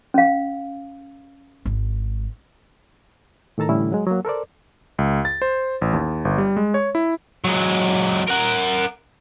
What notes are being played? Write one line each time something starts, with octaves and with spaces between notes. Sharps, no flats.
C#4 F5
G#1 G#3
A2 D#3 A4 A5 A#5
A2 D3 E3 G3 C#4 E4
F#3 G#3
F#3 A#3
A4 A#4 C5 D5
C#2
A6
C5
A1
D#2
G1
G3
G#3
C#5
E4
F#3 G#3
A#4 F#5